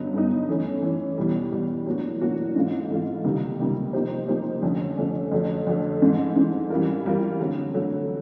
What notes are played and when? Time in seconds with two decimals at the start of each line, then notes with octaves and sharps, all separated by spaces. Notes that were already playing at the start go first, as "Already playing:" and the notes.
Already playing: G2 D3 F#3 B3 D#4
0.14 G2 D3 F#3 B3 D#4
0.49 E3 A3 C#4
0.82 E3 A3 C#4
1.18 E2 B2 G3
1.52 E2 B2 G3
1.86 A2 F#3 A#3 D4 F#4
2.21 A2 F#3 A#3 D4 F#4
2.55 G#2 E3 A3 C4 F4
2.90 G#2 E3 A3 C4 F4
3.24 C#2 C3 D#3 G3 A#3
3.59 C#2 C3 D#3 G3 A#3
3.93 F3 A#3 D#4 G4 C5
4.28 F3 A#3 D#4 G4 C5
4.62 F2 D3 F3 A3 C#4
4.98 F2 D3 F3 A3 C#4
5.32 F2 D3 F#3 A3
5.67 F2 D3 F#3 A3
6.01 G#2 E3 A3 C4
6.35 G#2 E3 A3 C4
6.70 E3 G3 C4 F4 A#4
7.05 E3 G3 C4 F4 A#4
7.39 D3 F#3 A3 C4
7.74 D3 F#3 A3 C4